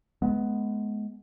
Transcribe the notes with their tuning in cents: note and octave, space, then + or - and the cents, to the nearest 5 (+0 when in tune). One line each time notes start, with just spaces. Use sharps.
G#3 +30 B3 +0